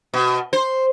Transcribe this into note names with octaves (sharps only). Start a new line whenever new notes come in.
B2
C5